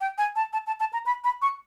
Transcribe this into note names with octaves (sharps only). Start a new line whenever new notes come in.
G5
G#5
A5
A5
A5
A5
A#5
B5
B5
C#6